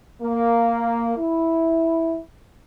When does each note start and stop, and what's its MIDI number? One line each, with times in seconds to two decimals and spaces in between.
0.22 1.16 58
1.16 2.19 64